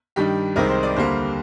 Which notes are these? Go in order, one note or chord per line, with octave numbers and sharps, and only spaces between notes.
G2 D#3 G3 D4 G4
C2 C3 D#3 G#3 C4 A#4
C5
D5
D#2 D3 G3 A#3 C5